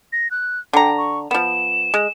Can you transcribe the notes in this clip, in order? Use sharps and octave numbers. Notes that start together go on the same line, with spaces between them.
A#6
F#6
D3 G5 A#5
C#6
F3 B3 E7
G#3